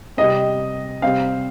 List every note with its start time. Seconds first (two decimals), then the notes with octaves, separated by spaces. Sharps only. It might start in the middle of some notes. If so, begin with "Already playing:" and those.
0.17 C3 G3 C4 D#5
1.02 C3 G3 C4 F5